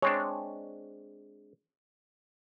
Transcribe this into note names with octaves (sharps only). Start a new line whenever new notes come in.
G#3 C4 D4 C#5